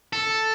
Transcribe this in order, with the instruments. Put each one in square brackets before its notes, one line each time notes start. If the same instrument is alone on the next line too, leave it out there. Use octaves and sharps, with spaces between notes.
[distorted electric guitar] A4